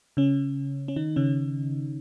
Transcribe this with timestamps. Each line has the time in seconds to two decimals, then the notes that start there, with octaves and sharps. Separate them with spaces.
0.17 C#3 C#4
0.88 C#4
0.96 D#3 D#4
1.16 C#3 C#4